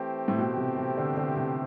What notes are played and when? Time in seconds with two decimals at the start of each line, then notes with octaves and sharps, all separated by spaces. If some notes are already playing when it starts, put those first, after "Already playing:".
Already playing: E3 A3 C4 G4 C5
0.28 A2
0.38 B2
0.58 C3
0.78 C3
0.97 D3
1.17 D3
1.36 C3